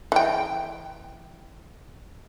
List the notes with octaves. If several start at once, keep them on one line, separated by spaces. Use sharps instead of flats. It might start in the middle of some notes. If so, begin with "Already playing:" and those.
E3 G5